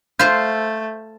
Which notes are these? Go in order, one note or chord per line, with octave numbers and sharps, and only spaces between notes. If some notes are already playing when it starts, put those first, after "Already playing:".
A3 F4 C5 G6